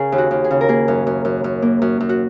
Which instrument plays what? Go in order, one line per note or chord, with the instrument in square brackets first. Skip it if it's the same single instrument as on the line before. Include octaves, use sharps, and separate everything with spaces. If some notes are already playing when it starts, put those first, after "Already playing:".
Already playing: [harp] C#3 G#4 A#4
D#2
F#4
D#2
G#4
C#3
A#4
A#3 G#4
F#2
F#2
F#2
F#2
A#3
F#2
F#2
F#4